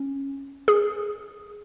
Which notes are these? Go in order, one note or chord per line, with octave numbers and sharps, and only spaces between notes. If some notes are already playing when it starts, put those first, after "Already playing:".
Already playing: C#4
G#4